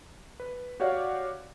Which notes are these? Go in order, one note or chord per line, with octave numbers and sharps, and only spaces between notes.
B4
F#4 G4 C#5 D5 F5 F#5